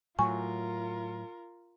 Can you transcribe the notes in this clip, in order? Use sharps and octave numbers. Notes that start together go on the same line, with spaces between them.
A2 F#3 F4 A#4 G#5 C#6